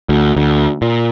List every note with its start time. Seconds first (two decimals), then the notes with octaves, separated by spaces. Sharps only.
0.09 D2
0.37 D2
0.82 A#2